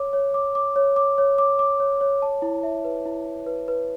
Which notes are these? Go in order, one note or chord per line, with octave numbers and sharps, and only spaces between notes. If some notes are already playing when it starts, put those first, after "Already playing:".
Already playing: C#5 D6
C#5
D6
D6
C#5
D6
C#5
D6
D6
C#5
C#5
A5
E4
E5
B4
E4
E4
B4
B4